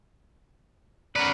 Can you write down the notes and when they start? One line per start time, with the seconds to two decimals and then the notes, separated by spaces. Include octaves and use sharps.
1.16 C#4 F#4 A#4 B4 D5